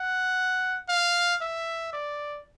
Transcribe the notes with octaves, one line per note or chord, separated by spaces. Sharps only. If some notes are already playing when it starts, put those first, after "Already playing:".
Already playing: F#5
F5
E5
D5